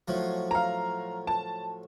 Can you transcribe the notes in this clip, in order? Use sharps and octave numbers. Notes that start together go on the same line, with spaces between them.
A2 F3 F#3
F5 A#5
A5